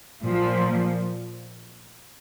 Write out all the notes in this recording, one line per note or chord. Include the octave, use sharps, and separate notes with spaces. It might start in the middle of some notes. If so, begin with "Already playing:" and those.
A#2 F3